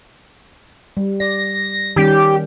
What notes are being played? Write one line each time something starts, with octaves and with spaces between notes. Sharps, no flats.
G3
D5 A#6
D#3 G3 C#4 G4